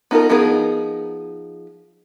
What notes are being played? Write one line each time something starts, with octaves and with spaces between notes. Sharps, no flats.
B3 D#4 F4 A4 A#4
F3 B3 D#4 G#4 A#4